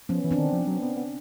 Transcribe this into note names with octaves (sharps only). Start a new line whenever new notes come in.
F3 B3 C#4
E3
C4 D4
D#3
F3
F#3
B3
B3